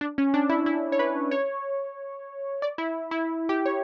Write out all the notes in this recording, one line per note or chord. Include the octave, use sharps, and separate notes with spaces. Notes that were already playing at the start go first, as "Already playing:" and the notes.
D4
C#4
D4
E4
E4
C#5
B4
C#5
D5
E4
E4
G4
C#5